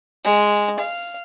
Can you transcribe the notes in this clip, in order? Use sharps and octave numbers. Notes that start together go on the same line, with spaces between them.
G#3
F5